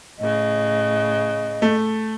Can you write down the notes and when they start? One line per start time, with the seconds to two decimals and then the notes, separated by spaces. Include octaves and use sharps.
0.19 A2 C#3 D#5
1.62 A3